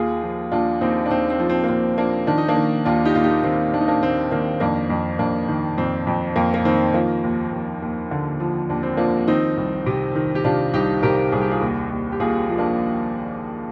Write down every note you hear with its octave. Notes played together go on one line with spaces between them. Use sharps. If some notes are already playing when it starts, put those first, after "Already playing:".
Already playing: D#2 F4 G#4
F3
D#2 D4 F4
D#2 C4 D#4
D4
D#2 C4 D#4
C4
F3
C4
A#3
D#2 C4
F3 A#3 D4
D#3 D4
D#4
A#3 D4
D#3
D#2 D4 F4
D#4 G4
D#2 F4
D#4 G4
D#3 C4 D#4
D#2 D4
D#4
A#3 D4
D#2 C4
D#3 A#3 D4
F2 A#3 D4
F2
F2 A#3 D4
D#3
F2 C4
F2
F2 A#3
A#3
D#3 C4
F3 A#3
D#2
D#2
D#2
D3
F3
D#2 D4
C4
F3 A#3 D4
D#3 C4 D#4
C2
C3
D#3
G4
C3 D4 F4
C2 D#4 G4
C3 G4 A#4
C2 G#4
G4
F4 G#4
D#2
D#2
G4
D#2 F4 G#4
F3
A#3 D4